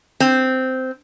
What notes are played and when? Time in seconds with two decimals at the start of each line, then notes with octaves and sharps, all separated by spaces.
0.20 C4